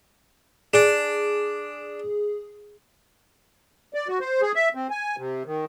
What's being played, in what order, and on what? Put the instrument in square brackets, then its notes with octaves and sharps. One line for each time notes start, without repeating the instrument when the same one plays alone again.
[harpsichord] D4 [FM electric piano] G#4
[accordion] D5
F#4
C5
G#4
E5
C4
G#5
C3
D#3